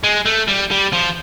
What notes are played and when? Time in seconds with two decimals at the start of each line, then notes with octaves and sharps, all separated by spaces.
0.04 G#3
0.25 A3
0.47 G3
0.71 G3
0.93 F3